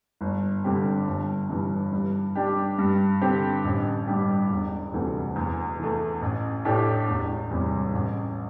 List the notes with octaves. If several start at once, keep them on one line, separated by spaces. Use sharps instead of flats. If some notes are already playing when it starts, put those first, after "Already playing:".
G1
G2 D3 C4 G4
G1
G2 E3
G2
G3 D4 G4
G2
D3 C4 G4
A1
G2 G3 D4 G4
E1
D2 C3 E3 A3
E2
E3 A3
A1
A2 A3 D4 G4
E1
E2 C3 G3
A1